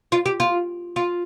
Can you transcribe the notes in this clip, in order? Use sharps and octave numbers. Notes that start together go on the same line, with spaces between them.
F4
G4
F4
F4